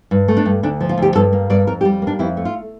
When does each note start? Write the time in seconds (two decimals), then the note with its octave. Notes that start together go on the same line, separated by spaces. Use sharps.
0.11 G2
0.28 A3
0.37 D4
0.45 G2
0.63 D2 D4
0.80 F3
0.89 F4
0.98 D2 G4
1.15 G2 A4
1.33 A#3
1.50 G2 D5
1.67 F2 A#4
1.81 G4
1.85 G3
2.02 A#3 D4
2.19 F2 E4
2.37 A3
2.45 F4